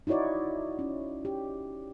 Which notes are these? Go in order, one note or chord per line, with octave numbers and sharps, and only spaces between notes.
D#4 E4 F#4 C#5 D5
C#4
G4